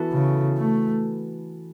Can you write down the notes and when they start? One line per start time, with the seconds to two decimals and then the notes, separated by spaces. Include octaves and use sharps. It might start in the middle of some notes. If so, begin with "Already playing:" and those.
Already playing: E3 B3 F#4 A4
0.12 C#3
0.58 A3